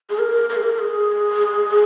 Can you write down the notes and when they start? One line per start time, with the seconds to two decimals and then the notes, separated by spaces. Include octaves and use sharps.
0.10 G#4
0.19 A#4
0.50 A#4
0.57 G#4
0.63 A#4
0.79 G#4